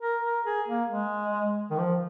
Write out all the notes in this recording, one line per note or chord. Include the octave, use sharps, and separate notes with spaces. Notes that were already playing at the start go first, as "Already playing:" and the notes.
A#4
A#4
G#4
A#3
G#3
D#3
F3